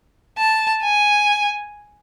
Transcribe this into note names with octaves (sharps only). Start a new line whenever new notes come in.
A5
G#5